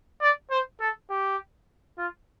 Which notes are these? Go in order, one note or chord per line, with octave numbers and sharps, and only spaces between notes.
D5
C5
A4
G4
F4